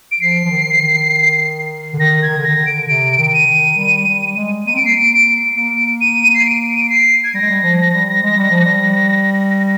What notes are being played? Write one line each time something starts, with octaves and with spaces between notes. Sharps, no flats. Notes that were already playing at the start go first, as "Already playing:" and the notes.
D7
F3 C7
F3
D#3
D#3
D3
D#3 A#6
G#6
D#3
D3
D#3 A#6
D3
D7
C3 D7
D#3
D#7
D#3
G3
G3
G#3
A#3 D#7
C4 D7
A#3 C7
D7
A#3 D7
D#7
C7
D7
D#7
D7
C7
G#6
G3 A#6
G#3
G3
F3
G3
G#3
G3
F3
G3